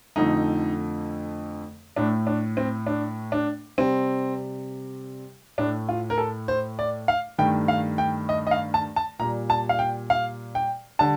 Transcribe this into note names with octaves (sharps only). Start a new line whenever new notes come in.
F2 D3 F3 A3 D#4
A2 A3 D4
D4
C4
D4
D4
C3 G3 C4
A2 A3 D4
F4
A#4
A4
C5
D5
F5
G2 D#3 A3 G5
F5
G5
D#5
D#5
F5
A5
A5
A#2 G3 A#5
A5
F5
G5
F5
G5
D3 G3 A5